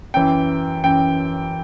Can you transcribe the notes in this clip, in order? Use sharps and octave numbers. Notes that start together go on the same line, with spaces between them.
F#2 E3 G5
F#2 E3 G5